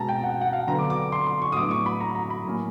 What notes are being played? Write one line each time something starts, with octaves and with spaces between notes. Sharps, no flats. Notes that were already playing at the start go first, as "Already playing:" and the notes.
Already playing: B2 G#3 C#4 A5 A#5
G5
F#5
F#5
F5
D3 F#3 B3 A#5
D6
D6
C6
C6
C#6
D#6
A2 F#3 B3 D4 D6
C#6
B5
A#5
A#5
B5
A2 F#3 A#3 C#4